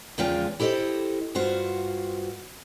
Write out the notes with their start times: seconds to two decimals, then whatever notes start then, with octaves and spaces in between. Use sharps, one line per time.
0.18 E2 C#3 F3 G#3 F4 G5
0.60 E4 G4 A4 C5 D#5
1.35 G2 F4 F#4 C5